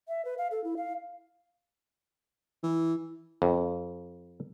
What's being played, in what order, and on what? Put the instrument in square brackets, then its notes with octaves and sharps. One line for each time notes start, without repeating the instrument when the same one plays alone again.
[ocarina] E5
B4
F5
A4
E4
F5
[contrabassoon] E3
[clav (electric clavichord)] F2